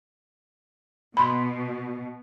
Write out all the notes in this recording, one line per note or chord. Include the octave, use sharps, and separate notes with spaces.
B2 B5 C6